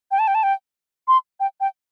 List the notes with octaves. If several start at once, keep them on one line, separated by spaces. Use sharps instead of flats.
G5
A5
G5
A5
G5
C6
G5
G5